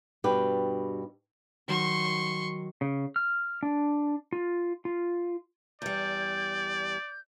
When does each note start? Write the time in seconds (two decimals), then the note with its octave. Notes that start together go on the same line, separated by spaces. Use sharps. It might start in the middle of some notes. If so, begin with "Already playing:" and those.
0.24 G2 B2 D4 G4 B4
1.68 D#3 F#3 C6 C#6
2.81 C#3
3.16 F6
3.63 D4
4.33 F4
4.85 F4
5.82 E2 G3 D5 G6